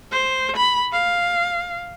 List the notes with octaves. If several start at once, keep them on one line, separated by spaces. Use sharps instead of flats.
C5
B5
F5